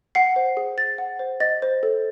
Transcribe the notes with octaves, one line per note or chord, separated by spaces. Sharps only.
F#5 C7
C5
G#4
G#4 A6
F#5
C5
D#5 A6
C5
A4